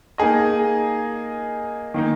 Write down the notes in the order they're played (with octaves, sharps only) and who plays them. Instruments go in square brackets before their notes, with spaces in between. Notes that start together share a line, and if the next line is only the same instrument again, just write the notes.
[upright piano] A#3 D#4 G#4 D#5
D#3 A#3 D#4